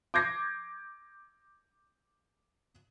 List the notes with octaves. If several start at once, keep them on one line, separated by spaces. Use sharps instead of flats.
D6 G6 G#6 A#6 C7